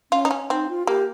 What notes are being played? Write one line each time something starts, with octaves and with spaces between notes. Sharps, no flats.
C#4 F4
D#4
C#4
C4 D#4
F4
A#3 G4